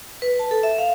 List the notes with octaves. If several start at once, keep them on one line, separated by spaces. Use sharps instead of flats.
B4
A5
A4
E5
F5